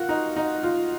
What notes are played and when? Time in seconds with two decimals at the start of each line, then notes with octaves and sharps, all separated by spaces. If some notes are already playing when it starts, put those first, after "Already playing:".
Already playing: F4 F#4 A#4
0.09 D#4
0.36 D#4
0.63 F4